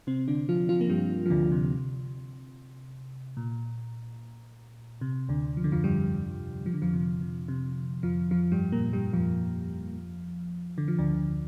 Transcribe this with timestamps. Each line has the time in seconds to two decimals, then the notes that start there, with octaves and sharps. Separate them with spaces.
0.07 C3 C4
0.28 D3 D4
0.49 F3 F4
0.69 F3 F4
0.81 A#3
0.90 G2 G3
1.26 F3
1.30 D2 D3
1.52 C3
3.37 A#2
5.01 C3
5.29 D2 D3
5.57 F3
5.64 D3
5.72 F2 F3
5.84 G2 G3
6.66 F3
6.74 D3
6.82 F2 F3
6.93 C3
7.21 C3
7.48 C3
8.03 F2 F3
8.31 F2 F3
8.52 G2 G3
8.72 A#2 A#3
8.93 G2 G3
9.13 F2 F3
10.78 D3
10.88 F3
10.99 D2 D3